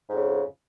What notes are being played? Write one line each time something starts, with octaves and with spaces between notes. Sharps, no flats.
F2 G#2 C#3